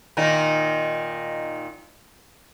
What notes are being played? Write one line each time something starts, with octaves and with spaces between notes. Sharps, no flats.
A#2 D#3 D#4